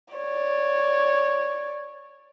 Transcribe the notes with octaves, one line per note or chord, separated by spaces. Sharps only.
C#5 D5